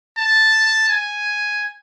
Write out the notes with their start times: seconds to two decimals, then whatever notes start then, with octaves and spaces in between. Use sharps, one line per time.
0.17 A5
0.89 G#5